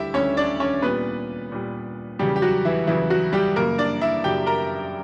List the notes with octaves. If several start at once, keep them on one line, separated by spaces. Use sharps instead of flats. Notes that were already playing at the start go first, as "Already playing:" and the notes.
Already playing: D2 D3 G3 E4 G4 E5
D2 D3 G3 C#4 C#5
D4 D5
C#4 C#5
A#2 G3 B3 B4
A#2 G3
E2 C#3 F#3 G3 G4
G4
F#3 F#4
E3 E4
E2 C#3 E3 F#3 E4
F#3 F#4
G3 G4
F#2 C#3 F#3 A#3 A#4
D4 D5
E4 E5
F#2 C#3 F#3 G4 G5
A#4 A#5